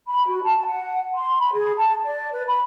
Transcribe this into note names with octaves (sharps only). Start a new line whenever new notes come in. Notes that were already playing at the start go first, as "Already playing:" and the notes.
B5
F#4
A5
F#5
C6
B5
G#4
A5
D5
B4
B5